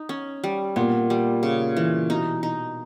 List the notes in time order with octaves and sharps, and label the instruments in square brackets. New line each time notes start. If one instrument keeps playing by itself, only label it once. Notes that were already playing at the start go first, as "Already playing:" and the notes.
Already playing: [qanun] D#4
C#4
G3
[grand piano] A#2 [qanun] B3
[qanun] G3
C#3
E3
[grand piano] B2 [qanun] D#4
[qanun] D#4